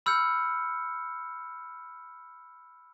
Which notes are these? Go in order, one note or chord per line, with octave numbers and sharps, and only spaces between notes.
B5 E6 F6 G6 C#7